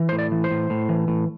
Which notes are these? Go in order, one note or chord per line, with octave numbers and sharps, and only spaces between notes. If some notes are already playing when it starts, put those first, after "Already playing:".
Already playing: E3
A2 C5
D5
E3
C5
A2
A2
E3
A2